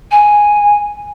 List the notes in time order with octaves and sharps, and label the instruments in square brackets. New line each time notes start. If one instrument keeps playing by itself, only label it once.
[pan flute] G#5